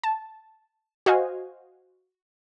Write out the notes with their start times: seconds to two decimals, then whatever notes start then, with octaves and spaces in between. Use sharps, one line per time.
0.03 A5
1.06 F#4 C5 D#5 F5 G#5